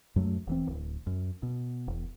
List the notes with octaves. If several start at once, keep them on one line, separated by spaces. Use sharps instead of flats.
F#2 F#3 A3
E1 E3 C4
D1
F#2
B2
E1